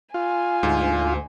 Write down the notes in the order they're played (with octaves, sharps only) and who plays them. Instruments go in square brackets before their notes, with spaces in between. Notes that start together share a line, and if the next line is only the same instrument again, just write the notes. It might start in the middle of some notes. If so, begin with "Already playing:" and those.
[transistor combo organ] F4 [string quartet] G#5
[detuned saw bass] D2 [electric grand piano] G#2